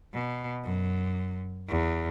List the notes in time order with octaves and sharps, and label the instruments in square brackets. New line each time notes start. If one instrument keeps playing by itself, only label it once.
[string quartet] B2
F#2
E2